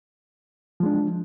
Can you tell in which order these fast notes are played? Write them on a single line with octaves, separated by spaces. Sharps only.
F3 G#3 D4